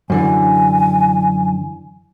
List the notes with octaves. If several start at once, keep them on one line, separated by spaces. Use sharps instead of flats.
F#2 D3 E3 G#5